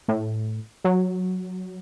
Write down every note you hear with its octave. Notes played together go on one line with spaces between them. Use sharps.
A2
F#3